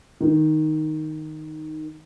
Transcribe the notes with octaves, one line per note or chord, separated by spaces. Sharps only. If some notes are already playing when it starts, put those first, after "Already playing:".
D#3